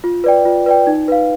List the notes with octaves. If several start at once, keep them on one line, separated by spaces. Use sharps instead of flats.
F4
B4 D5 G5
F4
B4 D5 G5
D#4
B4 F5